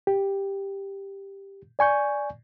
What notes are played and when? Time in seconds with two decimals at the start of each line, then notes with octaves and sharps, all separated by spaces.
0.07 G4
1.79 D5 G#5 C#6 G6